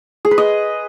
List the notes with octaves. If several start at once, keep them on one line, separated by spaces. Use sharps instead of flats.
G#4
B4
D#5